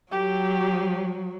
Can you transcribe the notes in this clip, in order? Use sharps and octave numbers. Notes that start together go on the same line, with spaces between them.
F#3 G4